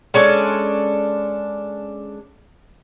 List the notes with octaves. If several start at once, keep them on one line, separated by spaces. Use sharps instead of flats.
G#3 C#4 D4 A4